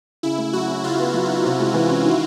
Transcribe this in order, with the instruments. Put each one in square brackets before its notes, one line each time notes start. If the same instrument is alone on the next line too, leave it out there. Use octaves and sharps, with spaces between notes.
[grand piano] C#3 [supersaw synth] E4
[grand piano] A3
[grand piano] F#3 [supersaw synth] F#4
[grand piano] C#4
[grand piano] C#3 [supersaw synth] F4
[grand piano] B3
F#3
D#4
C3
G#3
E3
C#4
D#3